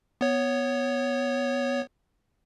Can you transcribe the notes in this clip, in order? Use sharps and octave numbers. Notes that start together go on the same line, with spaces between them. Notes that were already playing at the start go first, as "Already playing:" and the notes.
B3 C#5